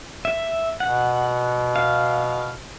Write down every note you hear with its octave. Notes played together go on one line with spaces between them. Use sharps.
E5
B2 F#5
F5